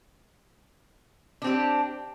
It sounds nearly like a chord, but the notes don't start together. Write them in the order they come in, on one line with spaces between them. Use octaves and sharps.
D4 C4 G4